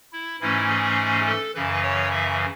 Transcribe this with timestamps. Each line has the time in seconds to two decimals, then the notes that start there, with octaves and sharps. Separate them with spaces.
0.13 E4
0.41 G#2 E3 A3 C#4 E4
0.69 G#4
1.26 A4
1.55 F#2 C#3 E3 B4
1.83 C#5
2.11 E5